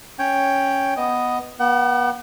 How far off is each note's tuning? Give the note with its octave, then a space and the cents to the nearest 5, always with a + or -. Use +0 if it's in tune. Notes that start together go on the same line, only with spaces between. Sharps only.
C#4 +0 C#5 +0 G5 +5
B3 +0 D#5 +0
B3 -35 F#5 +40